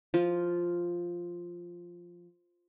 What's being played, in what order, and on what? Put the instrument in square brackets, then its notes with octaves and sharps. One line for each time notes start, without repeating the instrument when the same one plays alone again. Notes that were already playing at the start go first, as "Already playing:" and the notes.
[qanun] F3 F4